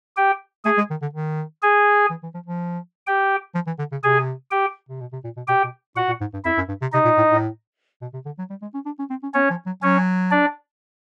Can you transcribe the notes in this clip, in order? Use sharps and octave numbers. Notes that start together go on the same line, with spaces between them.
G4 G5
A3 G#4 G#5
G#3
D#3
D3
D#3
G#4 G#5
E3
E3
F3
F3
G4 G5
F3
E3
D3
C#3
C3 G#4 G#5
G4 G5
C3
B2
C3
A#2
B2
B2 G4 G5
B2
A#2 F#4 F#5
A#2
G#2
G2
F2 E4 E5
F#2
G2
C3
C3 D#4 D#5
A#2
A2
A2
B2
C3
D3
F#3
G3
G#3
C#4
D4
C#4
C4
C#4
B3 C#4 C#5
F3
F#3
F#3 C#4 C#5
D4 D5